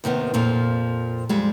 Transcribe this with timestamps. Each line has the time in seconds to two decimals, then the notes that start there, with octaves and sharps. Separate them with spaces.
0.04 D#2 C3 D#3 B3
0.34 F2 A#2 F3
1.29 F2 G3 G#3